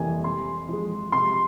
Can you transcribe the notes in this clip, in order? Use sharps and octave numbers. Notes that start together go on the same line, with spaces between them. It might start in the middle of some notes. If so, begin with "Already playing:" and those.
Already playing: F2 C3 E3 G3 A#3 G#5
C3 C6
F3 G#3
C3 C6